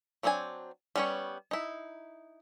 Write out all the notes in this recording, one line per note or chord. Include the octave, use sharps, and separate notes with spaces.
F#3 C4 D4 A4 G#5
G3 B3 C#4 A#4 C#5
D#4 E4